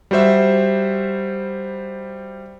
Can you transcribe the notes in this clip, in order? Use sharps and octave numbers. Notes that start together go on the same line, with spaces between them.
G3 F#4 C5 E5